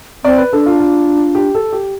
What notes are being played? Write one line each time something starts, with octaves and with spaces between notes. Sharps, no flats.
C4 D5
B4
D4 A4
F4
F4
G4
A4
G4